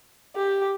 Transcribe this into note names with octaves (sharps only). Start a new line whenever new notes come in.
G4